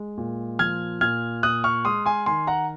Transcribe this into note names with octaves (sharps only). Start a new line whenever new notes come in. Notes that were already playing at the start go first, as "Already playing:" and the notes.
Already playing: G#3
A#2
F3 F6 G#6
A#2 F6 G#6
A#2 D#6 F#6
C#6 F6
G#3 C6 D#6
G#5 C6
D#3 G#5 C6
F#5 A#5